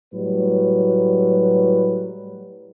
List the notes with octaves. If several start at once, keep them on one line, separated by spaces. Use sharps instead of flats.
A2 F#3 G3 B4